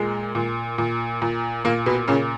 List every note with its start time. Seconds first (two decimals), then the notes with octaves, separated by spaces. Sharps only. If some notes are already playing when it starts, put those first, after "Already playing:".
Already playing: A#2 G#3
0.35 A#2
0.78 A#2
1.22 A#2
1.64 A#2 A#3
1.86 B2 B3
2.08 A#2 C#3 C#4